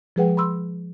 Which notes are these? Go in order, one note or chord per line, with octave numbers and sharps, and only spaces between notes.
F3 G#3 G#4 B4 F#5 G5
B5 C6 E6